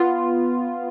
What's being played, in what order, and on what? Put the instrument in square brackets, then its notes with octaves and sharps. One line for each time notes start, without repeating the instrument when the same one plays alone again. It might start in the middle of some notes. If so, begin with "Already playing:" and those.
Already playing: [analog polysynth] B3 F4